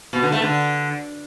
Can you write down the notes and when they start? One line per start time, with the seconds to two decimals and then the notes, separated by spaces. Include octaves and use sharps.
0.13 B2
0.23 D3
0.32 A3
0.42 D3